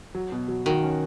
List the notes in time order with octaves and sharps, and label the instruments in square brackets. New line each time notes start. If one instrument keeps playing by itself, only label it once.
[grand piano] F#3
B2
F#3
[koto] D#3 [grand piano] F#4
[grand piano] C#4